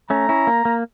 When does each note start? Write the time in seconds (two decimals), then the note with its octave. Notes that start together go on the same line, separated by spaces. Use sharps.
0.10 A3 C#4 A#5
0.29 C#4 E4
0.47 A#3
0.65 A#3